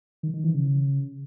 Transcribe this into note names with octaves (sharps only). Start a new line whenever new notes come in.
D#3
D#3
E3
C#3